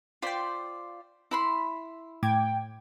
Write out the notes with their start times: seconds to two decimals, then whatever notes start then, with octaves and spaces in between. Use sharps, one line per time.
0.22 F4 C5 D5 G5 B6
1.31 E4 B5 C6
2.23 A2 G5 D6 G#6